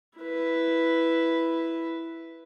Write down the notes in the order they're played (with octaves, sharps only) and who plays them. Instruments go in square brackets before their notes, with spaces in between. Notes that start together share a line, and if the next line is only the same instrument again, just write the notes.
[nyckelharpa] E4 B4